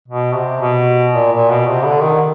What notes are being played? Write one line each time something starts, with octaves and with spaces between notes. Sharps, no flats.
B2
C3
B2
A#2
A#2
B2
C3
D3
D#3